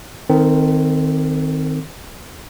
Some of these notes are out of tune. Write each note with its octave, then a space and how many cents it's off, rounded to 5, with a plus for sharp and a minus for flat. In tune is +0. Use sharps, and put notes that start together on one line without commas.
D#3 +0 C4 -10 A4 +35